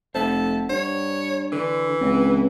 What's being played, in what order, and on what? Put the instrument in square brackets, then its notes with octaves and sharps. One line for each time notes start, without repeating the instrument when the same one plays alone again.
[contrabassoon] F1 [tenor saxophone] A4 [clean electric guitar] C5 E5 F#5
[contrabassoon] G2 [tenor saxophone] C#5
[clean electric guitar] D3 [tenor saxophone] E3
[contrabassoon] C#2 [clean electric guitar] C4